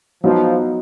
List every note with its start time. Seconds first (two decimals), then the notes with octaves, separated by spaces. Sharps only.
0.23 F3 F#3 B3 D#4